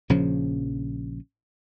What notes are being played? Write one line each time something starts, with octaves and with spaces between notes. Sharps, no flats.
A#1 C#3 F3 C#4